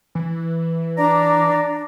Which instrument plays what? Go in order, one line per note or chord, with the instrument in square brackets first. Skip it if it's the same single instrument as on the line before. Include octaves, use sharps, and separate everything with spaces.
[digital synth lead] E3
[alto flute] D4 [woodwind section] D5 A#5